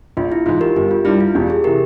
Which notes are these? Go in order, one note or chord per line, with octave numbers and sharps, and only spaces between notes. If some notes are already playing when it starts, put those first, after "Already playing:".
A#1 F4
E4
G#2 E3 F4
G4 A#4
G1 G4
F4
G2 G3 E4
F4
E1 G4
G#4
C3 E3 G4 A#4